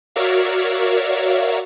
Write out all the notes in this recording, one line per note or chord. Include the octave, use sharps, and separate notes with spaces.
F#4 A#4 C#5 D5 E5 F5